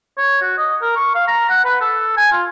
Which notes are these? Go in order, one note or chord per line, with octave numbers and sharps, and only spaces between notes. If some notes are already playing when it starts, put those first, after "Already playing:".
C#5
F#4
D#5
A#4
C#6
F5
A#5
F#5
B4
A4
G#5
F4